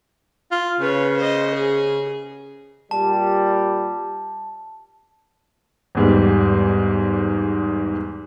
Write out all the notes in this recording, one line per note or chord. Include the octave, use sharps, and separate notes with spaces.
F4
C#3 B4 C#5
C5 D#5
G#4
A#2 G3 A5
E2 G#2 G3